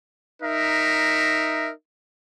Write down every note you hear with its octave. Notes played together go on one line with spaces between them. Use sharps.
D#4 A#4 E5